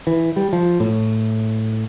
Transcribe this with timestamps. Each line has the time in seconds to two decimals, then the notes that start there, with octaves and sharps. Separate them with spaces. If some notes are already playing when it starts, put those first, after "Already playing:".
0.07 E3
0.36 G3
0.53 F3
0.80 A2